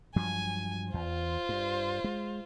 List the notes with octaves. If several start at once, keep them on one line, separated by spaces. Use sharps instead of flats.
G2 F3 F#3 G#5
E2 F4 C5
G2
G#3